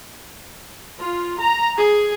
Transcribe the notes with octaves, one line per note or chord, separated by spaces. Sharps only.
F4
A#5
G#4